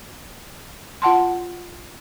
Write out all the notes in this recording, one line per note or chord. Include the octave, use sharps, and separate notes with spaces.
F4 F#5 A5 C6